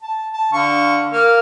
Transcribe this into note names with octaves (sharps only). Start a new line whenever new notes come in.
A5
A5
D3 F5 C#6
A#3 F5 F6